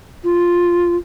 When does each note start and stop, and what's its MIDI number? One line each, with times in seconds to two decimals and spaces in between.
0.24 0.96 65